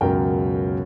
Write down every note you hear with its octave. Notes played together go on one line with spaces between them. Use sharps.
C#2 F#2 B2 A#4 G5